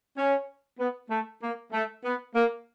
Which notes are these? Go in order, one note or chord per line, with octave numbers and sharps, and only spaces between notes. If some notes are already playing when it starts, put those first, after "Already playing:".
C#4
B3
A3
A#3
A3
B3
A#3